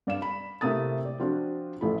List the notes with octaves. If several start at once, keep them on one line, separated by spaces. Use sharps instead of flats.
G2 D5 F5 E7
B5
A2 C3 A3 A#3 D#6 A6
D5
F3 C4 D4 F4 F#4
A1 A2 F3 A4 B5